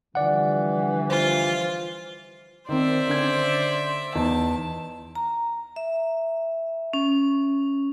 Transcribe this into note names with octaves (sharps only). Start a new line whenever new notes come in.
D3 E3 F3 G3 D5 F#5
F4 C5
D#3 C4 C5 D5 E5
D3 C#4 G#6
E2 D#4 A5
A#5
E5
C#4